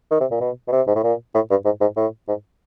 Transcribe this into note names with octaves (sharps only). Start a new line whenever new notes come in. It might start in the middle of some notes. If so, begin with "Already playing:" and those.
D#3
C3
A#2
B2
B2
C3
G#2
A2
A#2
A2
G2
G#2
G#2
A2
G#2